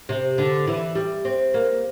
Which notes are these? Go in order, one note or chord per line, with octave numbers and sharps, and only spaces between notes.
C3
D3
E3
G3
C4
A#3